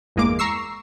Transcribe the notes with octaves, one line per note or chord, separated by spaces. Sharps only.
G1 E2 G#3 A#3 D6
A#5 C#6 E6 C7